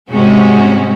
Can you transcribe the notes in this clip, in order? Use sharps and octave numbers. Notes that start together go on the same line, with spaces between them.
G#2 C3 G3 G#3 C#4 F#4